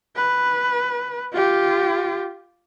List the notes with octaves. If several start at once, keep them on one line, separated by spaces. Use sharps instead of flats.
B4
F4 G4